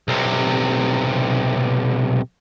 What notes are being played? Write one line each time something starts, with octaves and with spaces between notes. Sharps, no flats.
B1 C3